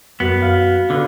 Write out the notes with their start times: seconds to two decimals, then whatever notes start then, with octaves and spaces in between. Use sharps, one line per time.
0.20 F#2 B3
0.42 F5
0.90 D3 F4 B4